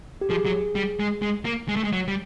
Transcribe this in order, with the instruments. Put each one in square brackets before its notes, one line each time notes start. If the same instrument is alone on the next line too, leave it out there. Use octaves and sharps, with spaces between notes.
[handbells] G4
[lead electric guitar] F3 [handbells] G#4
[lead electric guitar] F#3
G3
G#3
G#3
A#3
G#3
A3
G#3
F#3
G3